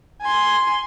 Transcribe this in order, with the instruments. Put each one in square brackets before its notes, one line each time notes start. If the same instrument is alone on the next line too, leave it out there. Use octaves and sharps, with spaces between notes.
[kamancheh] G#5 C6